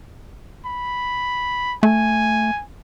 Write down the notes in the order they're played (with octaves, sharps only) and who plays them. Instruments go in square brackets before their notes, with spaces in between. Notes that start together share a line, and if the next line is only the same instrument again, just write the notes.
[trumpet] B5
[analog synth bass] A3 [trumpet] G#5